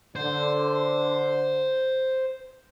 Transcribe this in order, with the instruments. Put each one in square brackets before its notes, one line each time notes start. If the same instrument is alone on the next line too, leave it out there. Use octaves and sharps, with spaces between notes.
[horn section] D3 [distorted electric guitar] C5